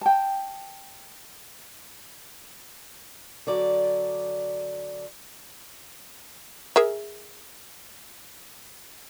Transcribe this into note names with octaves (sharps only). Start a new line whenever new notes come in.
G5 A5
D3 F#3 D5
G#4 A#4 E5